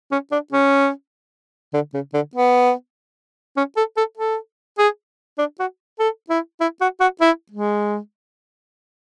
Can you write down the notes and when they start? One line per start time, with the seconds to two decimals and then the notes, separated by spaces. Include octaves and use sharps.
0.11 C#4
0.32 D4
0.52 C#4
1.74 D3
1.94 C#3
2.14 D3
2.35 B3
3.57 C#4
3.77 A4
3.97 A4
4.17 A4
4.78 G#4
5.38 D4
5.59 F#4
5.99 A4
6.30 E4
6.61 E4
6.81 F#4
7.00 F#4
7.21 E4
7.52 G#3